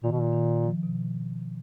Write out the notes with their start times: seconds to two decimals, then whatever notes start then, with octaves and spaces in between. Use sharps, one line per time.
0.03 A#2 D#3
0.11 B2
0.20 A#2
0.33 D#3
0.64 F3
0.83 B2